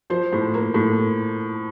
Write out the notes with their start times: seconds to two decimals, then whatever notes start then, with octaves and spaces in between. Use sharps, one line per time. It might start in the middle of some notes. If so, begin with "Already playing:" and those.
0.10 F3 C5
0.32 A2
0.54 A#3
0.74 A2